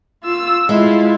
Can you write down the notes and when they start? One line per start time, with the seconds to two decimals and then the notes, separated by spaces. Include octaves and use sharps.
0.24 F4 E6
0.69 G#3 E4 F4